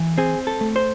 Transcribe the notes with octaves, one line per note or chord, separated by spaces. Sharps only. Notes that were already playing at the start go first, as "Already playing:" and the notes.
Already playing: E3
C4 G#4
A4
A3
C5